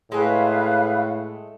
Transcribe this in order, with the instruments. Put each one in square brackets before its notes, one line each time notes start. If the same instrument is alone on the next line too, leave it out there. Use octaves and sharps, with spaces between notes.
[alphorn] A2 [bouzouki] G#3 A3 G#5 [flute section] B4 F5